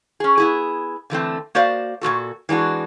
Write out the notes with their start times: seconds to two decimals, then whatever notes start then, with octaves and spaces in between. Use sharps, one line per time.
0.20 C#4 G#4
0.38 B3 E4 G#4
1.10 D3 E3 A3 C4
1.55 A#3 F#4 C5 D5 F5
2.01 A#2 G#3 F#4 A4
2.49 E3 G#3 D4 F#4